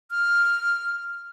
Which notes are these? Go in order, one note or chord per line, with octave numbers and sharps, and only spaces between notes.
F6